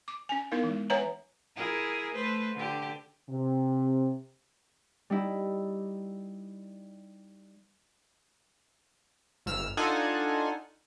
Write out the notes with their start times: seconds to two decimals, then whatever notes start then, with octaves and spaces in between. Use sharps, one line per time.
0.08 D6
0.29 C#4 G#5
0.51 B3 D#4 E4 A#4 F5
0.64 E3 G#3
0.90 B4 C#5 E5 F#5 G#5 A#5
1.56 E4 G#4 A#4
2.15 A3 B4 C5
2.56 D3 G4
3.30 C3
5.10 G3 D#4 E4
9.46 G1 E6 F6
9.77 D4 D#4 F4 A4 F#5 G#5